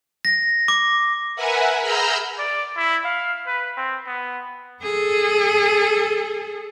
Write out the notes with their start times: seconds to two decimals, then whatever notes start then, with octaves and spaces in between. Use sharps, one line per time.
0.25 A#6
0.68 D6
1.36 A#4 B4 E5 F#5 G#5
1.82 G#4 A#5 B5 E6 F6 G6
2.38 D5
2.76 E4
3.04 F5
3.47 B4
3.77 C4
4.06 B3
4.83 G#4 A4